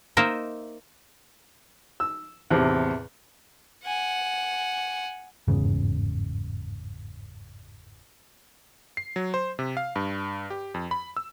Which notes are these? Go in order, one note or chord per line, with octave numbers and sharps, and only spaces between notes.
A#3 D#4 A#4 C5 D#5 E5
E6
E2 A2 C3 C4
F#5 G#5
G1 E2 G#2 C#3
C7
F#3
C5
C3
F5
G2
G4
F2
B5
E6